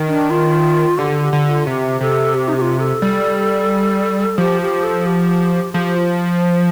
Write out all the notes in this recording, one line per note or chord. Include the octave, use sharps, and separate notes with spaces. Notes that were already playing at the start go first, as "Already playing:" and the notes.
Already playing: D#3
D4
F4
D3 G4
G4
D3
G4
F4
C3 G4
C3 A4
G4
D#4
G4
F4
A4
G3
F3 G4
G4
A4
G4
F3 G4 A4
F4